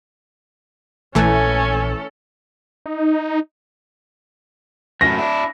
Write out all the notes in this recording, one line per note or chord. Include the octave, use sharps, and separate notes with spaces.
A#1 E3 A3 C#4 A4 G#5
D#4
F#2 A2 A#6
D4 E4